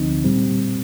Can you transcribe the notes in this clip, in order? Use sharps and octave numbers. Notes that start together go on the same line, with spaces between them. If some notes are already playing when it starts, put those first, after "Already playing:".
Already playing: D2 D3 F3 C4 D#4
A#2 G3 C4